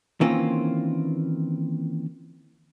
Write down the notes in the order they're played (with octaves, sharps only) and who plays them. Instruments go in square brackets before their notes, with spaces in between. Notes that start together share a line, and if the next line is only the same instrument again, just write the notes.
[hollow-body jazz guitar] D#3 E3 A#3 C4 C#4 F4